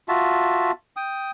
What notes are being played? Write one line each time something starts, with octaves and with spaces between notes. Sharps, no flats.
F4 F#4 E5 A5
G5 D#6